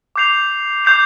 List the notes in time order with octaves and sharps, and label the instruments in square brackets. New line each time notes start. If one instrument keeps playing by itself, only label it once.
[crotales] D6 G6 C7 F7
D6 G6 C7 F7